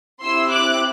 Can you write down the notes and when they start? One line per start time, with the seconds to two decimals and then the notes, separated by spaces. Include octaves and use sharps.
0.22 C4 E4 G4 C6 E6
0.50 D6 F#6